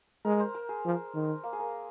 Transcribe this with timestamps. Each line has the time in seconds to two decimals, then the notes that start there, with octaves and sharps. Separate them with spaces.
0.25 G#3 A#4
0.40 C5
0.55 A#4
0.69 G#4
0.85 F3
1.15 D#3
1.44 A#3
1.53 G#4
1.60 A#4